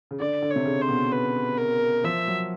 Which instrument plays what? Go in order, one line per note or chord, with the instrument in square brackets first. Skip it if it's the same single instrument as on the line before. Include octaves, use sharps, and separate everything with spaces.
[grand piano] C#3
[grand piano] D3 [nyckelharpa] D5
[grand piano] D3
[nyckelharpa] C#5
[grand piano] C3
C#3
[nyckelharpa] C5
[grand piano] B2
[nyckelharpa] B4
A#4
[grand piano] F3 [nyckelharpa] E5
[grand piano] F#3